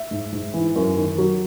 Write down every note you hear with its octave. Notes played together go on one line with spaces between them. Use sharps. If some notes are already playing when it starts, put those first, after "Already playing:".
Already playing: E5
G#2
G#2
E3
F#2
D#3
F#3